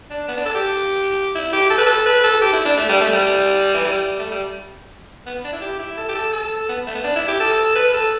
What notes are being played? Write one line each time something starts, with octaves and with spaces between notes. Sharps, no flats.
D4
B3
D4
A4
G4
E4
G4
A4
B4
A4
B4
A4
G4
E4
D4
A3
G3
A3
G3
E3
G3
A3
G3
B3
D4
E4
G4
E4
A4
G4
A4
A4
B3
A3
B3
D4
E4
G4
A4
B4
A4